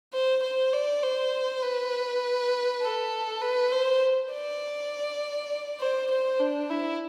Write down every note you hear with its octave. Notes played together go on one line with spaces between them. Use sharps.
C5
C5
D5
C5
B4
A4
B4
C5
D5
C5
C5
D4
E4